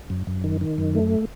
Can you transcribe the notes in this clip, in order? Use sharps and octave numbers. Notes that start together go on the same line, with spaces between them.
F#2
F#2
D#3
D#3
F#2
A3